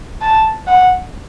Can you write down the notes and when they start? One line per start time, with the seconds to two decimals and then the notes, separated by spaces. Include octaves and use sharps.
0.21 A5
0.67 F#5